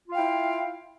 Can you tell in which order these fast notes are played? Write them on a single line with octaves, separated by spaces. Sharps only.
F4 F5 G5 E4